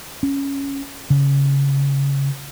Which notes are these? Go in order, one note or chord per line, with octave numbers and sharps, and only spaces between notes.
C#4
C#3